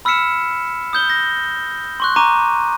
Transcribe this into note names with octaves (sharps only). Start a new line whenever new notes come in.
B5 E6 F6 B6 C#7 E7
D#6 G6 G7
A#6
C6 C#6 F#6
A#5 C#6 D6 D#7